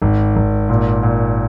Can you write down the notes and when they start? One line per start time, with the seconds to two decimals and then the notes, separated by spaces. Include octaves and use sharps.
0.02 G#1
0.36 G#1
0.69 A#2
1.03 A#2